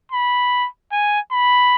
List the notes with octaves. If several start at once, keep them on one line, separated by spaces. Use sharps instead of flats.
B5
G#5
B5